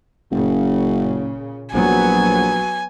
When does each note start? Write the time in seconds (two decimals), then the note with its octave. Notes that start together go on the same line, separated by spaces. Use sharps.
0.31 F#1 A#2 C#3
1.74 A#1 F#3 B3 G#5